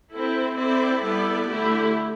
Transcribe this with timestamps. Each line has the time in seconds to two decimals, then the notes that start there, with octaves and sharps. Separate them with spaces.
0.11 C4 E4 A4
0.56 C4 E4 A4 D5
1.02 G3 B3 E4 A4 D5
1.48 D3 A3 E4 G4